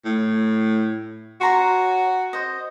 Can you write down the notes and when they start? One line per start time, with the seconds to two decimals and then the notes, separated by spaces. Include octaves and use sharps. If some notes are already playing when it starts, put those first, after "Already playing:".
0.05 A2
1.41 F#4 C#5 A#5 C6
2.33 C5 D#5